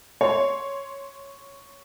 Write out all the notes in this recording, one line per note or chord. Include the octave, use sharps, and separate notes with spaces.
C#5 C6